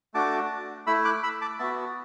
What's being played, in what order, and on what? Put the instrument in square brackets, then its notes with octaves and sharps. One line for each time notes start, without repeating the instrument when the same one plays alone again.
[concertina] A3 D4 F#4 A5 D6
A3 E4 B5 E6
D6 F#6
B5 E6
A5 D6
B3 F#4 E5 A5